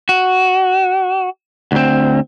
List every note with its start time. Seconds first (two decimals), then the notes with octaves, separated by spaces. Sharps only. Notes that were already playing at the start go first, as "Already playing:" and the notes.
0.09 F#4
1.72 D2 C4